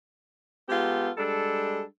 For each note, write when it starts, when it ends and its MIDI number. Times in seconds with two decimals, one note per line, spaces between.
0.69 1.10 56
0.69 1.10 59
0.69 1.10 65
0.69 1.10 67
0.69 1.10 69
1.18 1.83 55
1.18 1.83 56
1.18 1.83 62
1.18 1.83 69